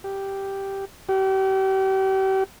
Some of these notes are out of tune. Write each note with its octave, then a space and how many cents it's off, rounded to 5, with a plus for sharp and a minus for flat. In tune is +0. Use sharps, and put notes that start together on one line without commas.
G4 +0
G4 -35